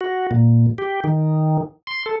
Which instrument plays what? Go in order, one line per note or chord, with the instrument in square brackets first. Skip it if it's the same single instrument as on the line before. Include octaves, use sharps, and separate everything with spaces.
[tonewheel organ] F#4
A#2
G4
D#3
C6
A4